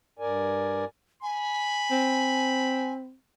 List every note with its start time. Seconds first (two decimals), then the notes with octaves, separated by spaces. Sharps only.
0.19 G2 A#4 D5 G#5
1.23 G#5 B5
1.91 C4